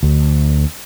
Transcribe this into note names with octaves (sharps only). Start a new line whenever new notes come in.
D2